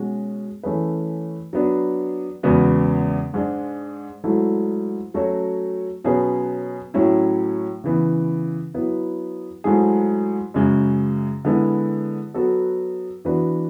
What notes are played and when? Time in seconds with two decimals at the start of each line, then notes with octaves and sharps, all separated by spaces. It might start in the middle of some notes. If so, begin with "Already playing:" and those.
Already playing: B2 G#3 C#4 F#4
0.63 E3 A3 C#4 G#4 B4
1.53 F#3 B3 D4
2.43 E2 C#3 G#3 B3 F#4
3.34 G#2 G#3 D4
4.24 G#2 F#3 A3 E4 A4
5.14 F#3 A3 C#4 F#4 C#5
6.04 B2 F#3 C#4 G#4 B4
6.94 A2 F#3 C#4 E4
7.84 C#3 E3 B3
8.74 F#3 B3 E4
9.64 G#2 F#3 A3 E4 G#4
10.54 F#2 C#3 G#3
11.45 D3 G#3 B3 E4
12.34 F#3 B3 F#4 A4
13.25 E3 B3 D4 F#4 B4